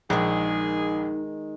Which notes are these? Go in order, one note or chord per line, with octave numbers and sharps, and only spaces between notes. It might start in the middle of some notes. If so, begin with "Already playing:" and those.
A#1 D#3 G#3 D#4 G#4